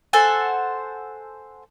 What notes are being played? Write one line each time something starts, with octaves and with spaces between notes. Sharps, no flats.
A4 C5 F#5 G#5